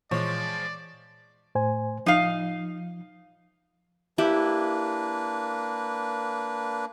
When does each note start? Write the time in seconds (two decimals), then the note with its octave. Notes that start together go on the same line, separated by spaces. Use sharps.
0.11 A#2 E3 F3 G#3 C#5 D5
1.55 A2 C5 G#5
2.06 F3 D#4 F5
4.18 A#3 D4 E4 G4 B4